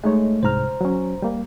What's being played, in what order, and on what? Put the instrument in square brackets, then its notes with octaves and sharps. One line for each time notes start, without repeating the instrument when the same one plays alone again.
[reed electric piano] G#3 D#4 C#5 [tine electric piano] A3
[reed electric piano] C2 G#2 F6 [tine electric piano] C5 A#5
[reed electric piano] F#3 C#4
G3 A#3